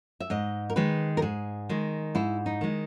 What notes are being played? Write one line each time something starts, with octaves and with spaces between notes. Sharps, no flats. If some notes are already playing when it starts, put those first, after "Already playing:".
E5
G#2 D#5
A#4
D#3 G#3 B4
A#4
G#2 G#4
D#3 G#3
G#2 E4
D#4
D#3 G#3